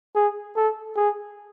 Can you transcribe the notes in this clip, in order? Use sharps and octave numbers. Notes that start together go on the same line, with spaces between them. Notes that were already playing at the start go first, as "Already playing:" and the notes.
G#4
A4
G#4